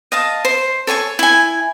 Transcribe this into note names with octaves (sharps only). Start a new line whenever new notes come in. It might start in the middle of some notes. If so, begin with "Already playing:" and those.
D#5 F5 A5
C5
A4 C#5 G#5 C#6
E4 G#5